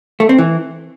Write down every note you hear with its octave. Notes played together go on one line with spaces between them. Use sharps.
A3
C4
E3